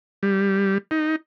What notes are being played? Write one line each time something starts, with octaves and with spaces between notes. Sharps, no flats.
G3
D#4